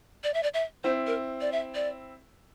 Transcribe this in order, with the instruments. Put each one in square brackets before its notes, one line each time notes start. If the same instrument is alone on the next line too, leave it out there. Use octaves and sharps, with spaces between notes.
[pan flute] D5
E5
D5
E5
[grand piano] C4 E4 [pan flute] C5
[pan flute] A#4
D5
E5
D5